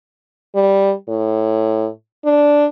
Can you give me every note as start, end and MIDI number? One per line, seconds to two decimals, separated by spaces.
0.55 0.92 55
1.09 1.89 45
2.24 2.66 62